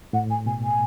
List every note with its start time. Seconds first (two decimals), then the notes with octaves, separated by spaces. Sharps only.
0.13 A2 F#5
0.30 G#5
0.46 B2 G#5
0.63 G#5